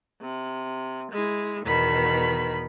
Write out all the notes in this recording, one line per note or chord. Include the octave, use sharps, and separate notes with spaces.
C3
G#3 E4
E2 B2 D#3 B5